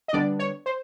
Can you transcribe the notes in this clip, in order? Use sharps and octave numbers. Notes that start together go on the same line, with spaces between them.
D#5
D3 G3 B3 D4 D5
C#5
C5